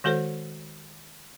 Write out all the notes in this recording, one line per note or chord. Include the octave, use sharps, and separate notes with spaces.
D#3 G#3 F#4 A4 C5